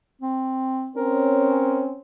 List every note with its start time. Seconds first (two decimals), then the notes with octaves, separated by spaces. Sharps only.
0.21 C4
0.96 C4 C#4 A#4